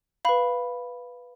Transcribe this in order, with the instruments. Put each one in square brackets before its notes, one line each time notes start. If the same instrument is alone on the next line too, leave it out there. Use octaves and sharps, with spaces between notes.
[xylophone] B4 F5 B5